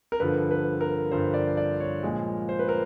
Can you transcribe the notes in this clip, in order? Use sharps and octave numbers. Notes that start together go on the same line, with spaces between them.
A#4
G2 D3 F3 B4
B4
A#4
G2 D3 F3 C5
D5
D5
C#5
A#2 F3 G#3
C5
B4
A#4